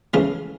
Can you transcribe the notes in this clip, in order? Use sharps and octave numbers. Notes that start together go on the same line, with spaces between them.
C#2 C#3 E3 A3 F5